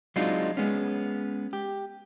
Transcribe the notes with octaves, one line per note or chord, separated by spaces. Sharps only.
F#3 G#3 C4 D4 D#4 F4
G#3 B3 C#4
G4